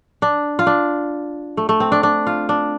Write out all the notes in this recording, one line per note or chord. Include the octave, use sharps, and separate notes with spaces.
D4
F4
D4
A3
A3
C4
D4
D4
F4
D4